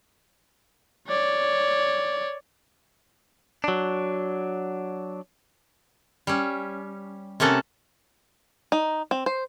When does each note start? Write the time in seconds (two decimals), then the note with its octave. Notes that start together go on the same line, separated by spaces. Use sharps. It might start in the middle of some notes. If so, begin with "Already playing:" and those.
1.07 C#5 D5
3.64 F#3 D4
6.27 G3 C#4
7.40 C3 A#3 C#4 A4 F#5
8.72 D#4
9.11 C4
9.26 C5